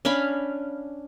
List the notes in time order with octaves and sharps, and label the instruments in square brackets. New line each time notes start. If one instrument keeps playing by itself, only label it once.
[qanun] C#4 D4 F5 B5